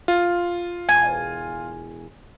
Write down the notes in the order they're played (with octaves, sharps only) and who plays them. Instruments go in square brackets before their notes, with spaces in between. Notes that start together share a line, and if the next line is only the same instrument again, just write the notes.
[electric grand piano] F4
[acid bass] E1 [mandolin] G#5